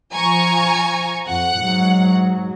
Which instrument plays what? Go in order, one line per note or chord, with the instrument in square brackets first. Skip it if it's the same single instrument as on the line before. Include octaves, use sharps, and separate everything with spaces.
[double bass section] F3 [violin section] G#5 A#5 C#6
[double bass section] F2 [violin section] F#5
[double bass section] G#2 F#3